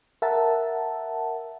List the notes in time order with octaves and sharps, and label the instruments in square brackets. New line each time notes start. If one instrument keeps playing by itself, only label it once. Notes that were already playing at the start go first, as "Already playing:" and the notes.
[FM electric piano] A#4 E5 F#5 A5